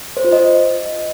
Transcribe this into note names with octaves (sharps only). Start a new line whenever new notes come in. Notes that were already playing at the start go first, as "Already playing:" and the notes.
C5
F4
D#5